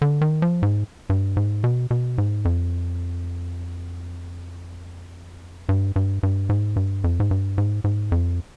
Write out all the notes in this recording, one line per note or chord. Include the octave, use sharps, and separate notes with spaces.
D3
D#3
F3
G#2
G2
G#2
B2
B2
G#2
F2
G2
G2
G2
G#2
G2
F2
G#2
G2
G#2
G#2
F2